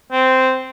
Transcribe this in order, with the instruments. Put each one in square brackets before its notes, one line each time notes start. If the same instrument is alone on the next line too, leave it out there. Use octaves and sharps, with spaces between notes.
[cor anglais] C4